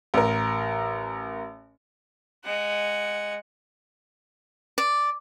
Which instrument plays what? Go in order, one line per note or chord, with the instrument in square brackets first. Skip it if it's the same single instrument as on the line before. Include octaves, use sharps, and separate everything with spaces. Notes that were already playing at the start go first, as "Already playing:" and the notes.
[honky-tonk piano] A1 A#4
[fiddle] G#3 F#5
[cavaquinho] D5